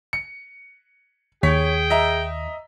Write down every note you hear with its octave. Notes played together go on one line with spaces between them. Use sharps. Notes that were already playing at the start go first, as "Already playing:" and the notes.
C#7
D#2 G#4 C#5 G5 B6
D#5 E5 A#5